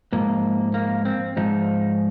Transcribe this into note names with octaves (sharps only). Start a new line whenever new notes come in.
G#2 F3 A#3
A#3
C4
G#2 F3 D#4